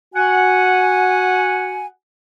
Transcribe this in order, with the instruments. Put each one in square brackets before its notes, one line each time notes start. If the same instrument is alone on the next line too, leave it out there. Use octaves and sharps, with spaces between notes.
[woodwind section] F#4 F#5 G#5